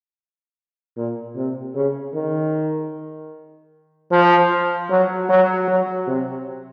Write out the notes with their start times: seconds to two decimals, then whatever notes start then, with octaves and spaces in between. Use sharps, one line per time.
0.97 A#2
1.36 C3
1.75 C#3
2.15 D#3
4.12 F3
4.90 F#3
5.29 F#3
5.68 F#3
6.07 C3